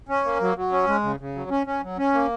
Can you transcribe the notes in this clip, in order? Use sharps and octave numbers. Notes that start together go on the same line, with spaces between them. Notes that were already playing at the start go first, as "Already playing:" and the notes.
C#4
A#3
F#3
F#3
C#4
G#3
C#3
C#3
F#3
C#4
C#4
F#3
C#4
A#3